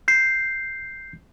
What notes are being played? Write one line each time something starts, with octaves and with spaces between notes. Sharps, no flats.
G6 C7